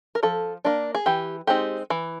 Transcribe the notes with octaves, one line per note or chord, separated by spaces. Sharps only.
A#4
F3 A4
A#3 D4
G#4
E3 G4
G#3 C4 D#4 G4
E3